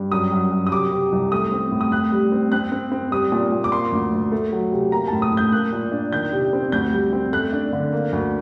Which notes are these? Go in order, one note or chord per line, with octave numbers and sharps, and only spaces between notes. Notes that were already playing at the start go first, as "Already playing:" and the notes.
Already playing: G2
F#2 D#6
F#2
F#2
D#6
C3 D6
C3
C2
A3 D#6
C4
A2
D#6
A2 F#6
G3
C4
C4 F#6
C4
C4
G3 D#6
A#2
A#2
D6
A#3 C6
D2
D2
A3
F#3
C3
A#3 A#5
A5
A2
D#6
A2
G6
A#3 F#6
A#2
D4
D#3 G6
C3
C4
D2 G6
G3
C4
A3 F#6
D4
D3
A#3
D2